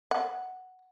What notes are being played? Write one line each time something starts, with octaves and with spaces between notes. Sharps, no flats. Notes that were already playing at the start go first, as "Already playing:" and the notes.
F#5